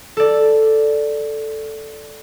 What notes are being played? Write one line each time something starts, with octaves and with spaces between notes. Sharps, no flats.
A4 D5